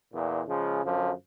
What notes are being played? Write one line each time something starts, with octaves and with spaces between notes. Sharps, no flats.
E2 A#2
C#3 F3 G#3
F#2 D3 F3